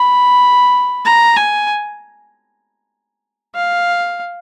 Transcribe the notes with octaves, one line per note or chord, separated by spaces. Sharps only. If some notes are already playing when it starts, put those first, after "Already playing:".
Already playing: B5
A#5
G#5
F5